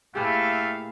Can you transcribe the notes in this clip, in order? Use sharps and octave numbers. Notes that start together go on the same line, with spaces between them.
A2 A3 A#3 G4 G#4 B4 E5 F5